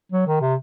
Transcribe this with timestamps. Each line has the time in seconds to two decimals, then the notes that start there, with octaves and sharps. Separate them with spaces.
0.12 F#3
0.27 D#3
0.41 C3